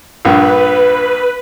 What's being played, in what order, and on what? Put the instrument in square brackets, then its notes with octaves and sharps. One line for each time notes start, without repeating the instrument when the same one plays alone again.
[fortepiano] A#1 G2 [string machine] B4